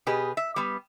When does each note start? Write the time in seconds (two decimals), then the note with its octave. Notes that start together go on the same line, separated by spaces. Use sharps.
0.07 B2 G4 G#4 B4
0.37 E5
0.56 G3 B3